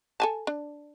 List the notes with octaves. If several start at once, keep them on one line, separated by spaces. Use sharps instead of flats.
A4 G#5 A5
D4